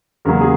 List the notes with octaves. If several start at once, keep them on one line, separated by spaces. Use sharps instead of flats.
E2 C#3 F#3 A#3 A#4
G#4